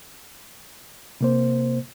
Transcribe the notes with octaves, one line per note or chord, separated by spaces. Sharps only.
C3 A#3 C5